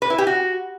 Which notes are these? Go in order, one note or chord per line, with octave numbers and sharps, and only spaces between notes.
B4
E4
G4
F#4